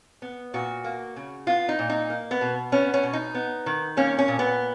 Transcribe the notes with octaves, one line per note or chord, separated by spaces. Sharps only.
B3
A#2 F#4
A#3
C#3
B3 F4
D#4
A#2
D#4
A#3
B3
B2
B3 C#4
C#4
B2
D#4
B3
D#3
A#3 C#4
C#4
A#2
B3